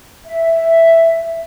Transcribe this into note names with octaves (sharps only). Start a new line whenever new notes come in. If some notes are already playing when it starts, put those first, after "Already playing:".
E5